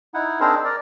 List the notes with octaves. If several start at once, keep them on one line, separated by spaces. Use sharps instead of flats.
D#4 E4 F#5
C4 D4 D#4 G#4 A#4 C5
A#4 D5